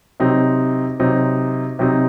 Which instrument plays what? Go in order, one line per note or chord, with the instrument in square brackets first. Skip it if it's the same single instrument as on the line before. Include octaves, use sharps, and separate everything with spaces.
[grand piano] C3 F#3 C4 D#4
C3 F#3 C4 D#4
C3 F#3 C4 D#4